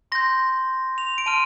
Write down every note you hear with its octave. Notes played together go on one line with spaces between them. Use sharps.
C6 G6 A#6
F7
D7
A5 C6 F6 D#7